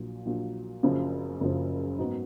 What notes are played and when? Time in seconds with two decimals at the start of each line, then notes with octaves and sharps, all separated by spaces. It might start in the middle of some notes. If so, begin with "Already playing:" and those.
Already playing: A#1 A#2 F#3
0.26 A#1 A#2 F#3
0.83 F#1 F#2 C#3 F3
1.40 F#1 F#2 C#3 F3
1.98 G#2 F#3 B3 D#4